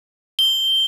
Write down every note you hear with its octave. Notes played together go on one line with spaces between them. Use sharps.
G7